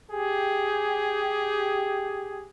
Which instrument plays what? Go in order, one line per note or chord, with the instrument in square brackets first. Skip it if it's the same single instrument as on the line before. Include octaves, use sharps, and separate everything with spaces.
[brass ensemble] G4 G#4